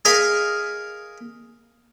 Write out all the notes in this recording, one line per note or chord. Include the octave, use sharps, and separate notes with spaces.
G#4 A#4 D#5 F5 B5 D#6